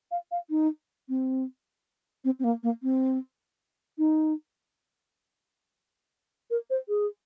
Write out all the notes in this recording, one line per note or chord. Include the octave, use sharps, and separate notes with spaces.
F5
F5
D#4
C4
C4
C4
A#3
A#3
C4
D#4
A#4
C5
G#4